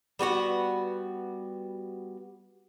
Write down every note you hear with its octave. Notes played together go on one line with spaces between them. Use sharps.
G3 B3 F#4 F#5